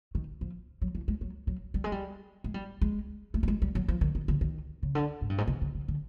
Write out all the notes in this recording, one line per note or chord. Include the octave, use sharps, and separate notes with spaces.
D#3
F3
F#3
E3
G#3
F#3
F#3
G3
G#3
G3
G#3
G3
G#3
A3
G3
G#3
G3
F#3
F3
D#3
D#3
D3
D#3
C#3
D3
G#2
G2
G#2
C3
C#3
C#3
D3